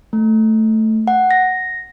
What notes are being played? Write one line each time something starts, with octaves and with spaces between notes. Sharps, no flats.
A3
F#5
A#6